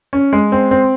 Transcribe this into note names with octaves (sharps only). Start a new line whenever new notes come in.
C#4
G#3
C4
C4